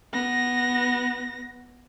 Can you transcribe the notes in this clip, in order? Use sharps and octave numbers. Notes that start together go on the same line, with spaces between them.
B3 A#6